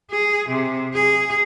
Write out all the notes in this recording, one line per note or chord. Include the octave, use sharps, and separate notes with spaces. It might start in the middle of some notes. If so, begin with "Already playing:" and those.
G#4
C3
G#4